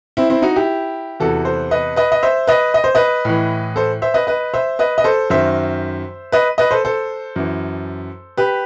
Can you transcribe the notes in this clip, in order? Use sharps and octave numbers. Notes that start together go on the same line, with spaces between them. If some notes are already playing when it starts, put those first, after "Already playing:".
C4 E4
C4 E4
D#4 F#4
E4 G4
E2 C3 E3 F#4 A4
A4 C5
B4 D#5
B4 D#5
D#5
C5 E5
B4 D#5
D#5
C5
B4 D#5
A2 E3
A4 C5
C5 E5
B4 D#5
B4 D#5
C5 E5
B4 D#5
D#5
A4 C5
F#2 D#3 C5 E5
B4 D#5
B4 D#5
A4 C5
A4 C5
F#2 E3
G4 B4